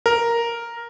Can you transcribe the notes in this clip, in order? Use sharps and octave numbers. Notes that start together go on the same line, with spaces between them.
A#4